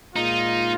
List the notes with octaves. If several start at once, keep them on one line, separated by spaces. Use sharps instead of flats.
A#2 G#3 D#4 F4